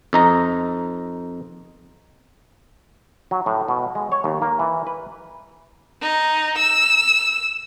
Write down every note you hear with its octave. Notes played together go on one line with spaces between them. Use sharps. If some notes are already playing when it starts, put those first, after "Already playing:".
F2 D#4 A#5
F#3
A2
B2
G#3
C#5
D#2
A#3
E3
B4
D#4
E6